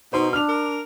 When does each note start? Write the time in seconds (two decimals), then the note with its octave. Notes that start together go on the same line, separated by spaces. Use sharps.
0.13 B2 D#4 C5 C6
0.33 D4 F6 F7
0.48 A#4